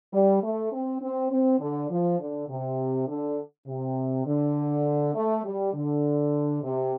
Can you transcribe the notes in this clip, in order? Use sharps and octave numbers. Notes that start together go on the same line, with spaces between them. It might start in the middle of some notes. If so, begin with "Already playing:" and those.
G3
A3
C4
C4
C4
D3
F3
D3
C3
D3
C3
D3
A3
G3
D3
C3